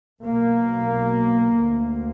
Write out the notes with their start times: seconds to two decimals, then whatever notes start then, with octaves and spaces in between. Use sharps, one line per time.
0.24 B1 B2 A#3
1.57 D2